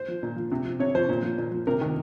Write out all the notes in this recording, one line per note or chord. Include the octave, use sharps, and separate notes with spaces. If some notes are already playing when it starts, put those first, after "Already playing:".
Already playing: C5
F3
A#2
F3
C3
F3
C3 C#5
F3 C5
A#2
F3
A#2
F3
C3 A#4
D#3